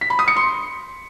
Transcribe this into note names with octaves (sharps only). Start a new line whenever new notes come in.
B6
B5
D#6
C#7
C6